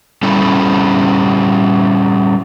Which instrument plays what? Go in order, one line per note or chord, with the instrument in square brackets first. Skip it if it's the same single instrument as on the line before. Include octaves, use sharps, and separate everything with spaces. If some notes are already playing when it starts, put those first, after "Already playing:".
[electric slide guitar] G3 C#4 E4 A4